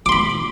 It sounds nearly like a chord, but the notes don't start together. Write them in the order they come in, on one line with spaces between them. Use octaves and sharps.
D6 C6 B5